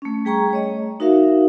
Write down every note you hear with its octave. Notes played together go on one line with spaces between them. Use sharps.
A3 C#4
G3 G#4 G5 A#5 C#6
A3 C#5 D#5
D#4 F#4 A#4 E5 F5